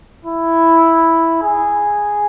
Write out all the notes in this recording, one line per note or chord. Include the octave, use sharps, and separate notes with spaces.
E4
G#4